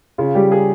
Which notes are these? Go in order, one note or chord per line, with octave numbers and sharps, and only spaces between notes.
C#3 F4
G3 G4
G#4